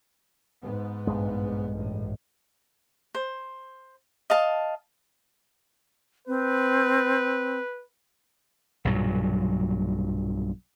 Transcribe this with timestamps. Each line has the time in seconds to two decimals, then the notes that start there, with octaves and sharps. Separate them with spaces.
0.62 G#2 B3
1.07 A#1 G2 G#3
1.72 A1 A2
3.15 C5
4.30 D#5 F5 A5
6.28 C4 B4
8.85 B1 G2 A#2 F#3